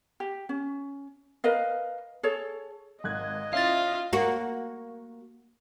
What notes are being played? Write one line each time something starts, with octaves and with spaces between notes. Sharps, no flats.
G4
C#4
A#4 B4 D#5 F5
G#4 A4 C#5
G#1 D#5 F#6 G#6
C#4 E4 F4 E5 F5 A6
A#3 F#4